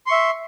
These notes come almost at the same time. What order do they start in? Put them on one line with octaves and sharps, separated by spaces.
C6 C#6 E5